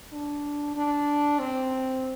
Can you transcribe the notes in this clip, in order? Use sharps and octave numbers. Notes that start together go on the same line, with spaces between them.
D4
D4
C4